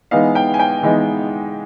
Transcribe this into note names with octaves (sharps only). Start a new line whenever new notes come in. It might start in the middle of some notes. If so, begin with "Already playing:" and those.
E3 G#3 B3 D#4 F5
G5
G#5
G5
E3 G#3 B3 D#4